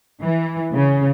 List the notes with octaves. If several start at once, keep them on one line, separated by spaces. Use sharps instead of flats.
E3
C#3